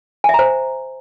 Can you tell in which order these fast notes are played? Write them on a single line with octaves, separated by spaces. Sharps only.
G#5 E5 A#5 C5